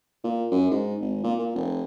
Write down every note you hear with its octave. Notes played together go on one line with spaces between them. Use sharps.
A#2
F#2
G#2
G#1
A#2
A#2
F1